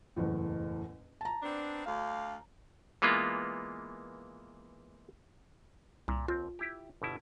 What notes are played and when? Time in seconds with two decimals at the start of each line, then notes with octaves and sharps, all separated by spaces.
0.16 F#1 E2 A2
1.21 A5 A#5
1.42 B3 C4 D4
1.85 D2 F5
3.02 E3 G#3 A#3 B3 F4
6.08 C2 A#2
6.28 D#2 C4 F4
6.59 E4 G4
7.02 G1 B2 E4